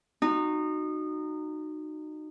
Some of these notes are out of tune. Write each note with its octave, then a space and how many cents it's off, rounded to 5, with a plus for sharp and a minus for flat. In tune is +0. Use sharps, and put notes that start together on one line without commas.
D#4 -25 F#4 +0